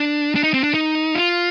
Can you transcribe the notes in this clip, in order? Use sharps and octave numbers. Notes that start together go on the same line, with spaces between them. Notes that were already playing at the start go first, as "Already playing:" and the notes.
Already playing: D4
D4
D#4
C4
D4
D#4
F4